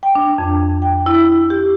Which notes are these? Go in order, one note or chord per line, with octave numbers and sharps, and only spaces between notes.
G5
D4
F2
G5
E4
G4